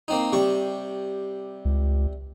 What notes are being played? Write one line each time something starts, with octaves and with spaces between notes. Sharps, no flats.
A#3 C4 D#4
C3 G3 C#6
C#2